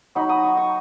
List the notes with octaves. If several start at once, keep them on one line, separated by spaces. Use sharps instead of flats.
F#3 D#4 B5
D#6
C#6
C#6